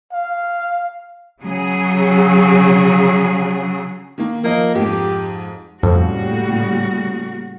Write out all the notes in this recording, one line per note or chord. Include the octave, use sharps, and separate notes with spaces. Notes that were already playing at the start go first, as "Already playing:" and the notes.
F5
C#3 F#3 G#4
D#3 A#3
F3 A#3 D#5
F2 G#2 G4
F2 A2 C#3 G3 A#3 F#4